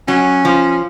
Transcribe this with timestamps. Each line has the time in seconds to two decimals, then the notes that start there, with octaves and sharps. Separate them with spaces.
0.08 F#3 C#4
0.45 F3